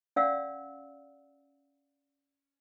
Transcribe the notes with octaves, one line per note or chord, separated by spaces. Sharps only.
C#4 D5 F5 F#5 E6